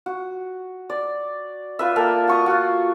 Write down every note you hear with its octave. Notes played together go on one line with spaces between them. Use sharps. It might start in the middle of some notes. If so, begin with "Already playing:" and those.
F#4
D5
F4 B4 E5
A#3 A4 A#4 G5
F#4 C#6 D#6
F4 F#4